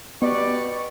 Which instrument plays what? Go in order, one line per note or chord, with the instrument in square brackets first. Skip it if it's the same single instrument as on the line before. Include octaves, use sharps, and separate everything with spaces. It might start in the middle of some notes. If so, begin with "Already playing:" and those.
[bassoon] B2 [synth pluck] B3 [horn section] G4 B4 D5 [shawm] C#6